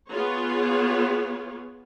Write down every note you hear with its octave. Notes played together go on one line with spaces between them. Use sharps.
B3 F4 G#4 C#5